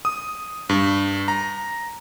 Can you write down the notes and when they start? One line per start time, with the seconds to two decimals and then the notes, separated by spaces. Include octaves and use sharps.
0.05 D#6
0.69 G2
1.28 A#5